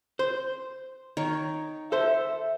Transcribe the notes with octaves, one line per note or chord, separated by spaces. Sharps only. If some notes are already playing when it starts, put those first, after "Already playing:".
C5
D#3 C#5
A4 C5 E5